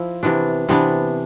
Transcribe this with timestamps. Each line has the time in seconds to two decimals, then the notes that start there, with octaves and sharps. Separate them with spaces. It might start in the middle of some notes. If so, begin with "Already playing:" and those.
Already playing: F3 E4
0.23 C3 E3 B3 D4
0.69 C3 E3 B3 D4